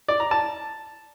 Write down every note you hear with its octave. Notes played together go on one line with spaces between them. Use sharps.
D5
A#5
A5